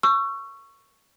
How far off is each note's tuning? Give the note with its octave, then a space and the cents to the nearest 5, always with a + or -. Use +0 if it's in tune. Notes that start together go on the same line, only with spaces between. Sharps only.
C#6 +0 E6 +35